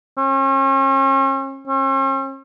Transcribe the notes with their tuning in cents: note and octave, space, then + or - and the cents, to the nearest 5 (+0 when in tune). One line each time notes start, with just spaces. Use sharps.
C#4 -40
C#4 -45